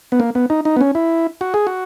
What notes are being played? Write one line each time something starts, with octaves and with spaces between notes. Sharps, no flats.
B3
A#3
B3
D#4
D#4
B3
C#4
E4
F#4
G#4
F#4